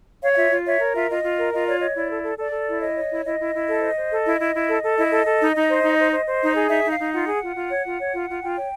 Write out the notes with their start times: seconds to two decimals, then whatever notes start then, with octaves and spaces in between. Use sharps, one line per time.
0.22 C#5 F5
0.32 F5
0.36 F4 E5
0.51 F4
0.65 C#5 E5
0.79 A#4
0.94 F4 E5
1.08 F4 D#5
1.23 F4
1.38 A#4
1.52 F4 D#5
1.64 C#5 D5
1.78 C#5 D#5
1.94 E4 D5
2.09 A4
2.23 A4
2.38 A4 D5
2.52 A4
2.66 E4
2.80 C#5 D#5
2.95 C#5
3.10 E4
3.24 E4 D#5
3.39 E4
3.53 E4
3.67 A4
3.82 C5
3.96 C5
4.11 A4
4.25 E4
4.39 E4
4.53 E4
4.68 A4
4.82 A4
4.97 E4 D#5
5.11 A4
5.26 A4
5.40 D#4
5.54 D#4
5.68 C5
5.83 D#4
5.97 C5
6.12 C5
6.26 C5
6.41 D#4
6.55 G#4
6.69 D#4 E5
6.83 D#4
6.91 F5
6.98 D#4
7.12 F4 F#5
7.26 G#4
7.41 F4
7.55 F4
7.70 C#5
7.84 F4
7.98 C#5
8.13 F4
8.27 F4
8.41 F4 G5
8.56 C#5